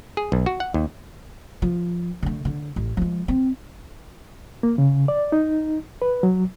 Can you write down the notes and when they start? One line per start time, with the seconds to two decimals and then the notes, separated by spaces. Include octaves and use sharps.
0.17 G#4
0.32 B1
0.46 F#4
0.60 F#5
0.74 D#2
1.62 F3
2.22 D3 A3
2.45 D3
2.76 A1
2.97 F3 G#3
3.28 C4
4.63 A#3
4.78 C#3
5.08 D5
5.32 D#4
6.02 B4
6.23 F#3